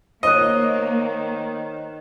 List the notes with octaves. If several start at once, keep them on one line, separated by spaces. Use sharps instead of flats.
D#3 A#3 C5 C#5 D#5 F#6